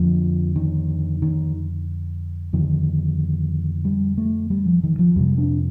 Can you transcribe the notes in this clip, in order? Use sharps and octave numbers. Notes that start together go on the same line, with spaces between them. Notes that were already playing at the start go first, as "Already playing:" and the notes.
Already playing: F2 D3 F3
D#3
D#3
F2 D3 D#3
G3
A3
G3
F3
D#3
F3
F2 C3 G3
D4